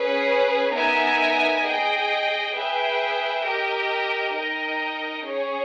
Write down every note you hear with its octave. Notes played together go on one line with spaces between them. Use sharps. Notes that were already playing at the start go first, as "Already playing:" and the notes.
Already playing: C#4 G#4 B4
B3 D#4 A#4 E5 G#5
G#4 D#5 G5
G#4 B4 E5 G5
G4 A#4 D#5 G5
D#4 A#4 D#5 G5
C#4 G#4 C#5